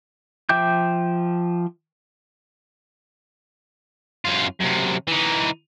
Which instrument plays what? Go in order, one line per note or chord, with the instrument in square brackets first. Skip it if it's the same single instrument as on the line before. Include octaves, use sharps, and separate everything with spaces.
[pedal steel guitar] F3 E5 G5 D6 G6
[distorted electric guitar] F#2 F4
F#2 C3
E3 D#4